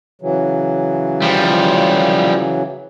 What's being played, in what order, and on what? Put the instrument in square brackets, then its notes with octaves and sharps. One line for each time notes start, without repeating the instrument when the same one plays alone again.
[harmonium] C#3 E3 F#3
[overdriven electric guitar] F3 G3